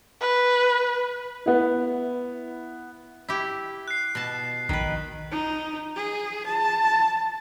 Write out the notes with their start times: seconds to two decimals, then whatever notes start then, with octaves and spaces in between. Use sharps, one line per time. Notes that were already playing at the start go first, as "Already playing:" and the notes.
0.21 B4
1.46 B3 E4
3.29 E4 G4
3.88 F#6 C7
4.15 B2 A5
4.69 A#1 D#3 B4
5.31 D#4
5.96 G#4
6.47 A5